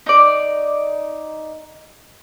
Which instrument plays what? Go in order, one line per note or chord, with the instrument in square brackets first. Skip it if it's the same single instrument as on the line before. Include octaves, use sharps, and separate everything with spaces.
[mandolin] D#4 D5